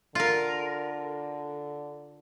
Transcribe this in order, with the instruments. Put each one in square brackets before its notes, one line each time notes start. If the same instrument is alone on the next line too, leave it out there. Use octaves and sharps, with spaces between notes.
[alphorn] D3 [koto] F4 A#4